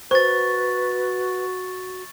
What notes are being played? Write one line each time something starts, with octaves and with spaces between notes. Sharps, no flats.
F#4 B4 C5 C#6 A6